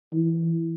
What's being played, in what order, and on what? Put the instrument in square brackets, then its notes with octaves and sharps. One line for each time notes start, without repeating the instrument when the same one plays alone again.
[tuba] E3